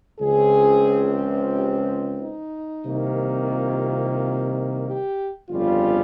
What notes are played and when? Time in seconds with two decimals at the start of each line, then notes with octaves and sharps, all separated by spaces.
0.20 C#2 C#3 F3 C4 G#4
1.53 G4
2.19 D#4
2.85 C2 C3 D#3 A#3
3.51 F4
4.85 G4
5.50 G1 F2 C#3 G3 F4